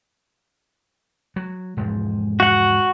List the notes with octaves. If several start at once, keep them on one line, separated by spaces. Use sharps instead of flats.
F#3
E1 G#2 F3
F#4 F#5